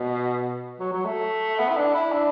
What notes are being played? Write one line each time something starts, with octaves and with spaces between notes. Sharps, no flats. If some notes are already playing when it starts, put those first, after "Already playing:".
Already playing: B2
F#3
F#3
A3
B3
E4
D4
E4
D4